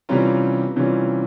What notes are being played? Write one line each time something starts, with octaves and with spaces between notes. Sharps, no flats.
C3 E3 G3 C#4 F4 A#5
C3 E3 G3 C#4 F4